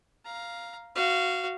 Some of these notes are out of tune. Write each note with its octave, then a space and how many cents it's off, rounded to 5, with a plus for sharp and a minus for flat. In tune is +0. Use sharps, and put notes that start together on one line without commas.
F5 +0 A#5 +10
F#4 +0 F5 -20